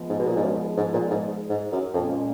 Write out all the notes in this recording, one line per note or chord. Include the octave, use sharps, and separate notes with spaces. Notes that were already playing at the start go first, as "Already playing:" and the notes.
Already playing: F3 G#3 B3
G#2
B2
A#2
G#2
F#2
G#2
A#2
G#2
G#2
F#2
F2 A#2 G#3 C#4